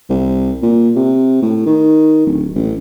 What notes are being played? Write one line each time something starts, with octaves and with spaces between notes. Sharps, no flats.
C2
A#2
C3
A2
D#3
D1
A1